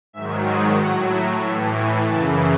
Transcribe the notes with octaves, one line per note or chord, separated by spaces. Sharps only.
G#2 D#3 F#3 E5
G#5
A2 F#3 F#5
E5
A2 E3 E5
G#5
F#2 C#3 E3 A5